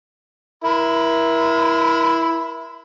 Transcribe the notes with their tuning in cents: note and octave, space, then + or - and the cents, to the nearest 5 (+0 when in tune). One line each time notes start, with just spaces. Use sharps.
E4 +0 A#4 +35 C6 -45